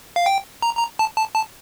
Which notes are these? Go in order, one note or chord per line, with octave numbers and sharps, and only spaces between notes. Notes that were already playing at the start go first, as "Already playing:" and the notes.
F5
G5
A#5
A#5
A5
A5
A5